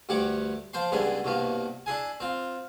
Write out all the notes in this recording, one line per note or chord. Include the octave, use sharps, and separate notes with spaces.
D2 G2 G4 C#5 F#5 D6
F3 C5 G5 C6
C#2 D3 G3 B3 E4 G#4
C2 G2 B2 A#3 B3
D4 E4 G#4 G#5
C4 F4